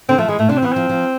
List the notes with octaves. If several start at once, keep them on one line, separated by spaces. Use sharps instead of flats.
D3 C4
F3 A3
E3 G#3
A2 A3
C3 D4
C4
E3 B3
F3 C4
F3